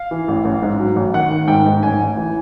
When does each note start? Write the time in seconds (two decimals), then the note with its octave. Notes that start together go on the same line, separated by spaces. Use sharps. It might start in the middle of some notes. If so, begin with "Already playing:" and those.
Already playing: F5
0.11 E3
0.28 A1
0.45 A1
0.63 G#2
0.79 F#3
0.96 A1
1.14 D#3 F#5
1.30 D#3
1.48 G#2 G5
1.66 G#2
1.83 A1 G#5
1.99 A1
2.17 E3